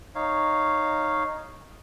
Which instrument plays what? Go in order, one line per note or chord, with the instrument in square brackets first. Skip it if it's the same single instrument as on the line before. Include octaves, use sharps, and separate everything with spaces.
[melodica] D#4 C#5 F5